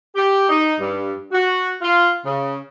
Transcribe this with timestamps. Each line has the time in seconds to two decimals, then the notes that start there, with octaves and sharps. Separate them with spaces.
0.15 G4
0.49 D#4
0.80 G2
1.32 F#4
1.82 F4
2.25 C#3